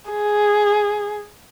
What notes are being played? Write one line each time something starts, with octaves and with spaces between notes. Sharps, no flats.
G#4